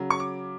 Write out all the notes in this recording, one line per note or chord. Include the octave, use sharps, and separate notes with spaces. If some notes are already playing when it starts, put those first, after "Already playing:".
Already playing: C#3 F#3
C#6
D6